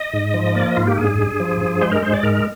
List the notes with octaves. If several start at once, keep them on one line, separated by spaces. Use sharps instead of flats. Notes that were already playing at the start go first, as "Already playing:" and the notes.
Already playing: D#5
G#2
F3
A#3 D5
D#5
G#2 F4
G4
G2 G#4
G2
F3
G2
G#3 C5
A#4
G#3 C5
D5
G#2 A#4